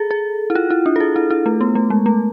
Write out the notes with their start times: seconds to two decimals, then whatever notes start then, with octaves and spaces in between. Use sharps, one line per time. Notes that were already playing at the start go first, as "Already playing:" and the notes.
Already playing: G#4 A4
0.11 G#4
0.50 E4
0.55 F4
0.70 E4
0.86 D4
0.96 A4
1.00 G#4
1.16 E4
1.30 E4
1.46 A3
1.61 B3
1.75 A3
1.90 G#3
2.06 A3